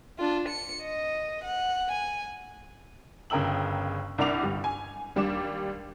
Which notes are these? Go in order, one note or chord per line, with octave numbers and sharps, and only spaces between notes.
D4 F4
C#7
D#5
F#5
G#5
G1 C#3 A#4 G5 E6 F#7
C2 D4 A#4 F#5 D6 F7
G1 G3
G#5
D#2 G3 D4 D6 E7